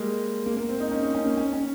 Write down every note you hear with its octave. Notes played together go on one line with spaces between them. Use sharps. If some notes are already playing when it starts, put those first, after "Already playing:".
Already playing: G3 G#3 A#3
A#3
A#3
C4
D#4
C#4
D#4
C#4
A#3
C#4
C#4